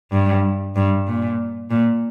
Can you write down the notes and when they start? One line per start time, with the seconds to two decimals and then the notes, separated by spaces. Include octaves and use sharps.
0.12 G2
0.76 G2
1.07 A#2
1.71 A#2